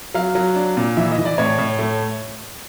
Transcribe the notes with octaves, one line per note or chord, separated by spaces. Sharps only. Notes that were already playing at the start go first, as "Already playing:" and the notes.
F#3 F5
F#3
D4
A#2
E3 E5
D#5
E3
D5
A2 C#5
A2
A3